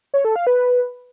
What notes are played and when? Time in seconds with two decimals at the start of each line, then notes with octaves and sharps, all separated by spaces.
0.14 C#5
0.25 A4
0.36 F5
0.47 B4